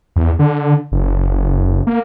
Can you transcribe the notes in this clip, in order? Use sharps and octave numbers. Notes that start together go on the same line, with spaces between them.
E2
D3
F#1
A#3